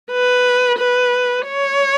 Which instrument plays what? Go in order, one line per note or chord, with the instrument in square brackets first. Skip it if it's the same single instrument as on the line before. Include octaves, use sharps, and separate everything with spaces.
[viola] B4
B4
C#5